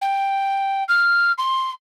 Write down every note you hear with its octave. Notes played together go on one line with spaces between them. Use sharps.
G5
F6
C6